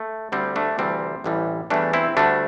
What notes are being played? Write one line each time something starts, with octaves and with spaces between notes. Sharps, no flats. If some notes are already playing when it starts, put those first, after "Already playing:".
Already playing: A3
D2 D3 G3 C4
A3 D4
D2 C3 E3 G3 C4
A1 A2 E3 G3
E2 E3 G3 A3 D4
C4 E4
D2 D3 G3 A3 D4